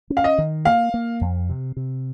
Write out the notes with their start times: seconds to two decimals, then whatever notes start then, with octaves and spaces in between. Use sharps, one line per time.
0.10 C#4
0.17 F5
0.24 D#5
0.38 D#3
0.65 A#3 F5
0.94 A#3
1.21 F2
1.49 C3
1.77 C3